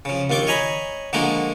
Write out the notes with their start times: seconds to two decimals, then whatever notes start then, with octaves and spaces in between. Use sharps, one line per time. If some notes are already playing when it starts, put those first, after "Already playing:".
0.05 C#3 F3
0.30 A#1 D#2 F4 C#6 D6
0.47 C#5 D#5 G#5 A#5 B5
1.13 D3 F3 G#3 A#3 F#4 A#4